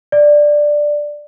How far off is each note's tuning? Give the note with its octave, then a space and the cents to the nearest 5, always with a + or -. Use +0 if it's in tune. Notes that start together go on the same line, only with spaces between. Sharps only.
D5 +5